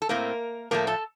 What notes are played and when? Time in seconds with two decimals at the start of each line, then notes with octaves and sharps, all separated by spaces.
0.02 A4
0.09 A2 A3 A#3 C4 A#4
0.71 A2 F3 A3 A#3 A#4
0.87 A4 A5